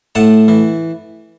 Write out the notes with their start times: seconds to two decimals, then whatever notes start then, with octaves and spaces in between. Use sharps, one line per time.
0.15 A2 F#5 A5
0.48 E3